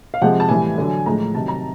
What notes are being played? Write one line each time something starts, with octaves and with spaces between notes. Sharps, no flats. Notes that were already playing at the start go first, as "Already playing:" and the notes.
F5
C3 F3 G#3 F#5
A5
A2 E3 G3 G#5
D3 F#3
A2 F3 G#3 A#5
C3 D#3 F#3 A5
A#5